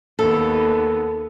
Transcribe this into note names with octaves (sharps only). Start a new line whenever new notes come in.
D#2 B3 A4